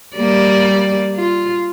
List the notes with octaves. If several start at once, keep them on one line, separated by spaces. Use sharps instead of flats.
G3 A#3 D5
F4